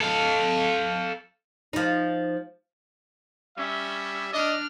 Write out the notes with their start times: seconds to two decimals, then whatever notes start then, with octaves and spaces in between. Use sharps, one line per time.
0.01 A4 F5
1.73 F3 D#4
3.58 G3 C#4 E5
4.33 D4 D5 D#5 F6